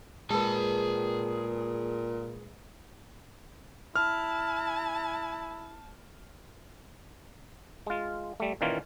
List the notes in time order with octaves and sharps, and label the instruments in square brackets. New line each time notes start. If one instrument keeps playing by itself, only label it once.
[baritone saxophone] A#2 [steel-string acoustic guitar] G#3 B4 [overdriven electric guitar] G#4 A5
[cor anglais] E4 [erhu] A5 [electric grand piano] F6
[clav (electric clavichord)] G#3 F4
G3 A3
A#2 D#3 E3 A#3 C#4 F4